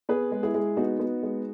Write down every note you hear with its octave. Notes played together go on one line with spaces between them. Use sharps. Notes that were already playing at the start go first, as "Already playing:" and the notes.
B3 G#4 B4
G#3
E4 G#4
G#3
B3 D#4 F#4
B3
G#3